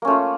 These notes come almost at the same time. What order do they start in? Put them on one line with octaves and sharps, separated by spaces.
A#3 C#4 A3 F4